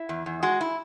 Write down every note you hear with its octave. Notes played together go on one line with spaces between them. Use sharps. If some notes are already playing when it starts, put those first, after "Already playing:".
Already playing: E4
E2
E2
G#3 F#4
E4